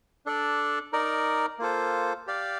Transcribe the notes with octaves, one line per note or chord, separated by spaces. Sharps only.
D4 A4 D5
D#4 A#4 D5
A#3 F4 A4 C5
G4 D5 F5